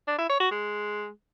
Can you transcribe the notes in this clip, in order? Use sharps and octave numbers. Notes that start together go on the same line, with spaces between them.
D4
E4
C#5
F#4
G#3